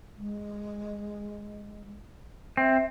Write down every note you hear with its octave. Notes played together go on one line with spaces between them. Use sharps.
G#3
C4 E5